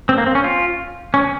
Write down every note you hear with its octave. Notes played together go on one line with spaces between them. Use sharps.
C4
A#3
C4
C#4
F4
C#4